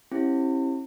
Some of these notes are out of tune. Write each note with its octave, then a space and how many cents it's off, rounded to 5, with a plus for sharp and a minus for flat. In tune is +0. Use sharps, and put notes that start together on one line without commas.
C#4 -45 E4 +0 G4 +0